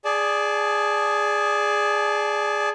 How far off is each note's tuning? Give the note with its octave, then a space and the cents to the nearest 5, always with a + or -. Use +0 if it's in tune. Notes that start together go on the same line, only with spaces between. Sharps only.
G#4 +0 D5 +0 A5 -30